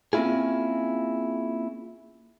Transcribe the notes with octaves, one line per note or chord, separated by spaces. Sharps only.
A#3 C4 C#4 E4 F4 G#4